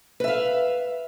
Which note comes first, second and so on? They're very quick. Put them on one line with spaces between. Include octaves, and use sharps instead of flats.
B4 E5 F5